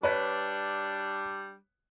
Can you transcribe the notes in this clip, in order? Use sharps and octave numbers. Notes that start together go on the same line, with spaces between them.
G3 D4 B4 C#5 B6